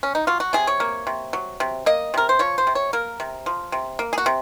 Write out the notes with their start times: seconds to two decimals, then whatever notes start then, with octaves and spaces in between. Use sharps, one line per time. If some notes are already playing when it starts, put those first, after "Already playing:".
0.03 C#4
0.15 D#4
0.27 F#3 F4
0.40 F#4
0.53 C3 G#4
0.67 C#5
0.80 A#3
1.07 C3
1.33 F#3
1.60 C3
1.86 A#3 D#5
2.14 C3 A#4
2.29 C5
2.39 F3 C#5
2.58 C5
2.67 C3
2.75 C#5
2.93 A#3 A#4
3.20 C3
3.46 F3
3.72 C3
3.99 A#3
4.13 G#4
4.18 F#4
4.26 C3